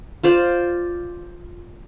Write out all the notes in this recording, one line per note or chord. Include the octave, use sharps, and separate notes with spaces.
F4 C5 D5